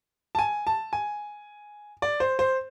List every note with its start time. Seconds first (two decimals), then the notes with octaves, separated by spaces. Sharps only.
0.35 A5
0.39 G#5
0.67 A5
0.93 G#5
2.02 D5
2.20 C5
2.39 C5